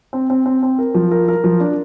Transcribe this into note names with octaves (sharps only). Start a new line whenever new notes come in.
C4
C4
C4
C4
A#4
F3
A#4
A#4
F3
D4